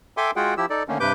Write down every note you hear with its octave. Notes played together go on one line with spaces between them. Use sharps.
A4 E5 G5 G#5 C6 D6
G#3 F4 F#4 G#4 F#5 G5
F3 E4 G4 E6
D#4 A4 D5
D3 D#3 A3 A#3 C#4
G2 C3 B4 D6 G6